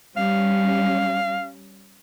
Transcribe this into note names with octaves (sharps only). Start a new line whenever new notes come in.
G3 C#4 F5